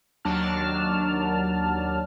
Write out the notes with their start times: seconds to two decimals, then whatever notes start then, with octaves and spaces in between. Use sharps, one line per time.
0.25 D#2 F#3 D4 A5 F6